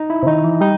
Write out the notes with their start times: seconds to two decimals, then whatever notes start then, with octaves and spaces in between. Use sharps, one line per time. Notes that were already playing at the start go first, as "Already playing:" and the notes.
Already playing: D#4
0.10 E4
0.23 C3
0.27 D#3 D#4
0.44 E3
0.61 G3 D#4